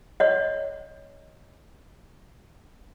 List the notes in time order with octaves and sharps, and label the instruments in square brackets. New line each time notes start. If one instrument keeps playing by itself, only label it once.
[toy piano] C#5 D#5